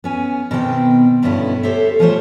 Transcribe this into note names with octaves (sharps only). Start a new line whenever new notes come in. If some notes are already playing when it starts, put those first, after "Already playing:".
B3 C#4 G#5
B2 D#3 B3 C4 D#5 G5
G2 B2 D3 B3 C#4 E4
G4 A4 C5 C#5 E5
E3 F3 G3 A3 C5 C#5